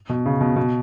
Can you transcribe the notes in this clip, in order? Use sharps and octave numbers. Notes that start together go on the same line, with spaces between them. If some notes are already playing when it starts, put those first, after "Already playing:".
B2
C#3
B2
B2